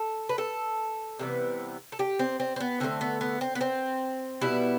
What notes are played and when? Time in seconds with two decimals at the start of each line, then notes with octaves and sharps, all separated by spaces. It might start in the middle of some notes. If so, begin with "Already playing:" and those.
Already playing: A4
0.29 B4
0.38 A4
1.19 C3 E3 G3 B3
1.92 A4
1.99 G4
2.19 C4
2.40 C4
2.56 C4
2.60 B3
2.80 D3 F3 A3 C4
3.01 B3
3.21 B3
3.41 C4
3.55 B3
3.61 C4
4.41 B2 G3 B3 E4